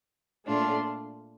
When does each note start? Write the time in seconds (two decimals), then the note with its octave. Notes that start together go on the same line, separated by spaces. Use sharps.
0.45 A#2 A3 D4 F4